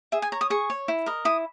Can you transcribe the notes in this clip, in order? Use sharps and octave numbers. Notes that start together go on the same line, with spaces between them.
G#4 E5
G#5
C#5 A#5
D#6
G#4 C#6
C#5
E4
A#4 D#5
E4 D#6